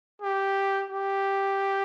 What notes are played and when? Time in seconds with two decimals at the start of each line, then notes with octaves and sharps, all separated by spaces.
0.22 G4
0.90 G4